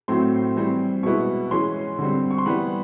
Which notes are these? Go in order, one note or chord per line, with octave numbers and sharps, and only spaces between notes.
A2 F#3 A3 C4 C6
E3 G3 C4
B2 G#3 B3 E4 C#6
E3 G#3 C#4 C6
D3 G3 C4
C#6
C6
E3 G3 B3 B5